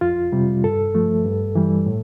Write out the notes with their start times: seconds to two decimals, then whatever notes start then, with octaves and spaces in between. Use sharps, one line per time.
0.01 F2 F4
0.32 C3 G3
0.64 G2 A4
0.95 F3 A3
1.25 G2
1.55 E3 G3
1.86 A2